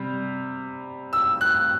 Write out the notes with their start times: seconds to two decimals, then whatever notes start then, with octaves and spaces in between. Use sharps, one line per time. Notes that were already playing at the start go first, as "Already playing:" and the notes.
Already playing: C3 G3
1.13 E6
1.41 F#6